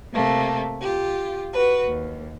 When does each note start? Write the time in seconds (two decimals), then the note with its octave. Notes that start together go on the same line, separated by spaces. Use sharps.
0.13 C3 A3 A#3
0.81 F4 G4
1.53 F#4 B4
1.86 D#2